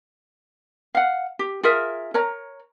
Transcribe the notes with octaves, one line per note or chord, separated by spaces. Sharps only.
F5 F#5
G4
F4 G#4 A#4 E5
A#4 C#5 A#5